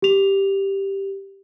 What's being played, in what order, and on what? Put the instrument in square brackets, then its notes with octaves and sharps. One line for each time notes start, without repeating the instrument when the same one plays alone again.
[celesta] G4 F7